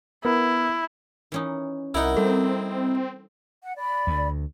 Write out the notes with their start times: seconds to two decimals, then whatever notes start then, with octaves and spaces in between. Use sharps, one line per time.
0.25 B3 E4 A#4
1.32 E3 C#4 D#4
1.94 C2 D#4 E4 A#4 F#5
2.17 G3 C4 A4
3.62 F#5
3.77 D5 B5
4.07 D2